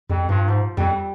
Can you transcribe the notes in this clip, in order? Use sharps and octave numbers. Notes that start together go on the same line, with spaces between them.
F2 G3
G2 F3
G#2 F3
F2 G3